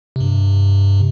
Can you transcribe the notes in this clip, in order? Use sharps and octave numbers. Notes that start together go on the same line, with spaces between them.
G2 C3